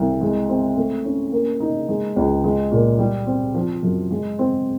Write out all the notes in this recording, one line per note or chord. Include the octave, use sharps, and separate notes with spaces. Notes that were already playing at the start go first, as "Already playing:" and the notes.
Already playing: C2
G#3
C4
A3
C#4
A#3
D#4
G#3
C#2
G#3
A#2
G3
C4
F3
F#2
G#3
C4